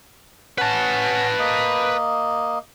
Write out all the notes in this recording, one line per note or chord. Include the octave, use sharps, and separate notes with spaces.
C#4 B4 F#5 A5
A#3 D#5